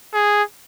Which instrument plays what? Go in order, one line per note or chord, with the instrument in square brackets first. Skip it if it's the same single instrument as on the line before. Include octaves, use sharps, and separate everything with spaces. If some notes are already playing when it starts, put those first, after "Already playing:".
[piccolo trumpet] G#4